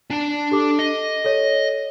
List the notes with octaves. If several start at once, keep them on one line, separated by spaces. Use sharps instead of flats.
D4 A5
G4 A4 D6
D#5
A4 C#5